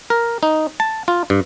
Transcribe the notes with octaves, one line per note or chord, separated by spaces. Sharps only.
A#4
D#4
A5
F4
G2